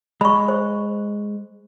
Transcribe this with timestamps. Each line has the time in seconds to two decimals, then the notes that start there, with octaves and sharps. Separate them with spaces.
0.21 G#3 B5 C#6
0.48 C5